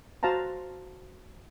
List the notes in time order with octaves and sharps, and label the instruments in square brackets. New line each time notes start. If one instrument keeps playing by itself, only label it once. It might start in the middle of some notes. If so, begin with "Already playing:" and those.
[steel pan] F#4 C5 F5 A5 A#5